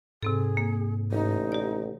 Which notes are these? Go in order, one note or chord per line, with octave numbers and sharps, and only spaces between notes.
G#2 C3 C4 G#4 A4
A#3
A1 D#4
G4 D5